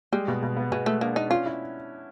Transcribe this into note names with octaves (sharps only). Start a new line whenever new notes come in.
G3 G#3
B2
B2
B3
B2 G#3
G#3 A3
A#3 D4
D4 D#4
C#4 F4
E4